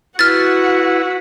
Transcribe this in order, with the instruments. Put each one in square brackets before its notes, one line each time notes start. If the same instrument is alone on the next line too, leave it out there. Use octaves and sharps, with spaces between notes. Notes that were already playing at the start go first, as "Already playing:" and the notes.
[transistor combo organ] E4 B4 [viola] F#4 F#5 [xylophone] F6 A6